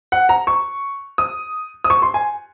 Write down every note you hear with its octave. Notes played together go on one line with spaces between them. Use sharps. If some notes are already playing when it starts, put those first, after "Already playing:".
F#5
A#5
C#6
D#6
D#6
C#6
C6
G#5